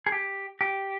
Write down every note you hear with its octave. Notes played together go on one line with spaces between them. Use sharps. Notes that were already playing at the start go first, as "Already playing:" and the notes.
G#4
G4
G4